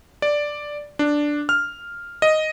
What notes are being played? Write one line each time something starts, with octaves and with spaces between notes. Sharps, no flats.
D5
D4
F6
D#5